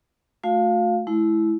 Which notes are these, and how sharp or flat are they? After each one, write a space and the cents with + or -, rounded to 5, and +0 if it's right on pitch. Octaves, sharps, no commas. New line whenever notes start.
A3 +0 F#4 -45 F5 +0
A3 -45 E4 +0